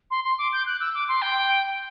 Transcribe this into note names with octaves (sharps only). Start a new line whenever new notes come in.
C6
C6
D6
G6
F#6
E6
D6
C6
G5